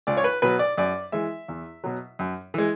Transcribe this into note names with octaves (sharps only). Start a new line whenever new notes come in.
C#2 D5
C#5
B4
B2 F#3 B4
D5
F#2 D5
E3 G#3 E5
E2
B2 F#3
F#2
E3 G#3